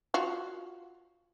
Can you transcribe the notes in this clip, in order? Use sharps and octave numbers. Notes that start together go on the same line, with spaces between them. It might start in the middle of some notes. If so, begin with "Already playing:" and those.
F4 F#4 F5